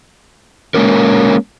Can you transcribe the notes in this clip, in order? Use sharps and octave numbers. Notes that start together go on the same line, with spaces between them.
G#3 A#3 C#4 A#4